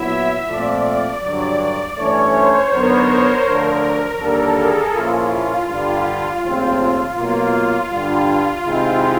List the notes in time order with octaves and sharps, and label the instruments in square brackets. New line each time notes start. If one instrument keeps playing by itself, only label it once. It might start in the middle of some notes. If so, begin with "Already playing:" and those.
Already playing: [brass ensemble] A#2 F#3 B3 E4 [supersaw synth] E5
[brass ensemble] A#2 F3 A3 C4 F4 [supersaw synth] D5
[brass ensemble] G2 D3 F#3
[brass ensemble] G2 E3 A3 C#4 [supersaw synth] C#5
[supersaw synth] C5
[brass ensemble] F#2 D3 F#3 B3 D#4 [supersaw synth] A#4
[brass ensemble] D2 D3 F3
[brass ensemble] D#2 D3 G3 A#3 D4 [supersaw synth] A4
[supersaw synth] G#4
[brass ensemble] A#2 F3 A#3 C#4 E4 [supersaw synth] F4
[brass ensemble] G2 D3 G3
D#2 C#3 F3 A3 C4
[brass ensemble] B2 F#3 A#3 [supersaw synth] F4
[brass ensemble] G2 D3 G3 [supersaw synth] F4
[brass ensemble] C3 D#3 G#3 C4 D#4 [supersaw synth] E4